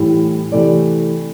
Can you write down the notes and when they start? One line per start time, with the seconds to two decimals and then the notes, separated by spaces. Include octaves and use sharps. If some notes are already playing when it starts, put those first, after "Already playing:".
Already playing: A2 E3 G3
0.52 C3 E3 A3 D5